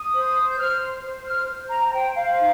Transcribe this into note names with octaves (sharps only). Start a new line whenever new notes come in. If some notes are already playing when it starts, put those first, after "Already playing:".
Already playing: D#6
C5
G6
C5 F6
C5
F6
C5
A#5
A#5
C5 G5
F5
D#4